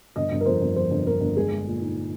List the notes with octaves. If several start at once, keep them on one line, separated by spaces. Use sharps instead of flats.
G1 D#5
G1
A#4
F2 C5
G1
F2 C5
G1
G1 A#4
G1
G#3 G#4
G#3
A#2
D#4